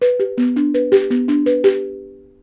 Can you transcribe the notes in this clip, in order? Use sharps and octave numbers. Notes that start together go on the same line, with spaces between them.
B4
G4
B3
D4
B4
G4
B3
D4
B4
G4